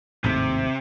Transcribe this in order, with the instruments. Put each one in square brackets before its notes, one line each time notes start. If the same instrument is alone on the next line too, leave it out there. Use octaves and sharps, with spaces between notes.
[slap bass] G#1 D#2 A2 [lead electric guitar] C3